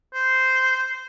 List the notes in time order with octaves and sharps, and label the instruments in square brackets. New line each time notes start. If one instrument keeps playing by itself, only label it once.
[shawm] C5